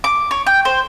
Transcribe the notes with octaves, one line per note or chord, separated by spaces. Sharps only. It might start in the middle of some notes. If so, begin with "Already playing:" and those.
D6
C#5
G5
C5